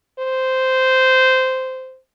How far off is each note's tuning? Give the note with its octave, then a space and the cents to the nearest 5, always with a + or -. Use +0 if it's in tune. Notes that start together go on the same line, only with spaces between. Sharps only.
C5 -10